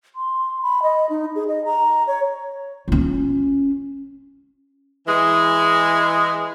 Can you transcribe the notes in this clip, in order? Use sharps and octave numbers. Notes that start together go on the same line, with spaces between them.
C6
B5
D#5
D#4
G#4
D#5
A#5
C#5
C#4 F4
E3 G#3